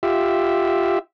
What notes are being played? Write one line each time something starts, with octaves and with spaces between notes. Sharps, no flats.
F4 G4 E5